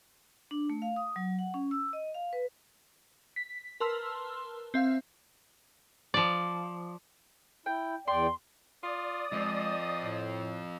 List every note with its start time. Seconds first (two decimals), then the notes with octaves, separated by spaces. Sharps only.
0.51 D4
0.70 A3
0.82 F5
0.96 D#6
1.16 F#3
1.39 F#5
1.54 C#4
1.71 E6
1.93 D#5
2.14 F5
2.33 B4
3.36 B6
3.80 A#4 B4 A5 C6 E6 F6
4.74 C4 E5 F5
6.14 F3 D5
7.66 E4 G5
8.08 E2 D5 G5 C6
8.83 F4 D5 D#6
9.32 F3 G#3 C4 D#5
10.02 A2